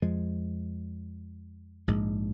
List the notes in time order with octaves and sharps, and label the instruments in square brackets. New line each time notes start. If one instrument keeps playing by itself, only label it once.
[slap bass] F2 F3 G#3
A#1 G#2 G#3